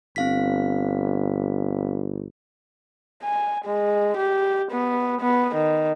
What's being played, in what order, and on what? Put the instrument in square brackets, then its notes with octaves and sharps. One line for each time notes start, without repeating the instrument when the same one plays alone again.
[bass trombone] G1 [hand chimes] C4 F5 B6
[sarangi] G#5
G#3
G4
B3
B3
D#3